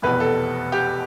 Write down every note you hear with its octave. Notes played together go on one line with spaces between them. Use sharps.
F1 E2 B2 B4
A4
G4